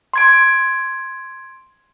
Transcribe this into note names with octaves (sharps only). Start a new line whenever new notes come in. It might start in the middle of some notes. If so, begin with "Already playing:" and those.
C6 G#6 D7